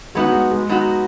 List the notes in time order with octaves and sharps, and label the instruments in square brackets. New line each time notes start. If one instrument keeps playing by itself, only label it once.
[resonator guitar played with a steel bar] F#3 B3 D#4 F#4 [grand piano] G#3
[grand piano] G#3
G#3
[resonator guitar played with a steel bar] F#3 B3 D#4 F#4